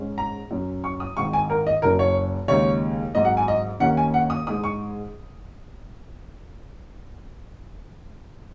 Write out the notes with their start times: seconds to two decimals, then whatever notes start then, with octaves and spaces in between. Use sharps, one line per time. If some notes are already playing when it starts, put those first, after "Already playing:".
Already playing: G#2 G#3 C#4
0.18 A#5
0.51 F#2 F#3 C#4
0.84 C#6
1.00 D#6
1.17 G#1 G#2 D#3 C#6
1.33 G#5
1.50 A#4
1.67 D#5
1.82 F#1 F#2 F#3 A#4
1.99 C#5
2.48 D#2 C#3 G#3 D#4 C#5
3.14 G#1 G#2 F#3 D#5
3.25 F#5
3.37 G#5
3.48 D#5
3.80 D#2 D#3 A#3 C#4 F#5
3.97 G#5
4.14 F#5
4.30 D#6
4.46 G#2 G#3 D#4 D#6
4.64 C#6